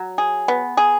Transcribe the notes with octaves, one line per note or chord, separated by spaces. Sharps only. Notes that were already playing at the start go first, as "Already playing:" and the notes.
Already playing: F#3
G#4
B3
G#4